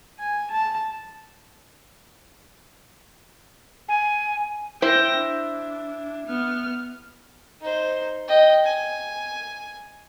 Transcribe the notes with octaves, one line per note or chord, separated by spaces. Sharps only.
G#5
A5
G#5
E4 C5 G5 A#6
D4
B3 F6
D#4 C5
D#5 G5
G#5